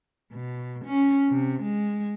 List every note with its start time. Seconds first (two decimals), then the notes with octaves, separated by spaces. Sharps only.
0.33 B2
0.85 C#4
1.29 C3
1.63 G#3